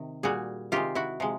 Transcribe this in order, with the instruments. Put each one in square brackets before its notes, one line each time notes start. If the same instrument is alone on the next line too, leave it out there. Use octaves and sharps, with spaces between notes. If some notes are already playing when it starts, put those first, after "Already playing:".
Already playing: [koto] C3 D#3
A#2 G3 F#4 G#4
C3 D#3 G#3 F4 G4
E4 F#4
C3 F3 G#3